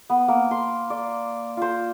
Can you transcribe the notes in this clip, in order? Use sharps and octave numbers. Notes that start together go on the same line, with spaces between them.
B3
A#3
C6
D5
F4 C5